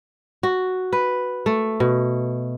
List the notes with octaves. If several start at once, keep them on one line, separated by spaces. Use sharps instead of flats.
F#4
B4
A3
B2